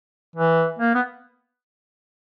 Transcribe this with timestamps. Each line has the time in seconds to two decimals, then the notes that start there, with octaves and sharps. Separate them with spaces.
0.36 E3
0.79 A#3
0.95 B3